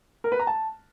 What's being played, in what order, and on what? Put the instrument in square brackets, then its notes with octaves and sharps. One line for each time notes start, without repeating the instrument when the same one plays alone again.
[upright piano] A#4
B4
A#5
A5